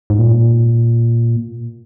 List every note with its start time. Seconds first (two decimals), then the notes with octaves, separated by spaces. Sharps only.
0.10 G#2
0.19 A#2